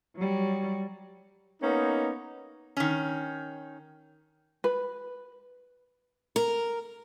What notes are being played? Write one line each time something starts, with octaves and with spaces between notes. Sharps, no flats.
F#3 G3
A#3 B3 C#4 D#4
D#3 C#4
B4
A#4